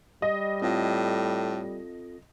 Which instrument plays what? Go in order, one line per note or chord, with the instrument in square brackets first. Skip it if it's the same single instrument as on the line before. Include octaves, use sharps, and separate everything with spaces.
[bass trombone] G3 [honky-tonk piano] D#5
[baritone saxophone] A2 [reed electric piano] C4 F4 A4